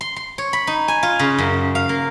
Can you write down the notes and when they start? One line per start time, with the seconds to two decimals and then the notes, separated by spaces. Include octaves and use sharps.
0.01 C6
0.16 C6
0.38 C#5
0.53 B5
0.67 D#4
0.88 G#5
1.03 F4
1.19 C#3
1.38 F#2
1.75 F5
1.89 A#3